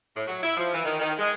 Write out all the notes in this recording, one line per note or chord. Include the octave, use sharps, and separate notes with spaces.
A2
F#3
E4
F3
E3
D#3
D#3
G#3